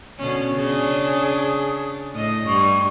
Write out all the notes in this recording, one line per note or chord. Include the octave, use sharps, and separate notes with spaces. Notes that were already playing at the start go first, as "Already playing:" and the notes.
B2 D3 C#4
C#3 D4 G#4
A2 D#5
G2 C#6